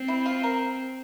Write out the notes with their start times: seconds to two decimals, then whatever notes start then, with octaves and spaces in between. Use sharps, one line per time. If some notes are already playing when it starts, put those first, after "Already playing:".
Already playing: C4
0.08 E4
0.26 F4
0.43 A#4